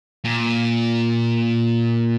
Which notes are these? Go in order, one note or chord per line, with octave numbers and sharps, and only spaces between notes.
A#2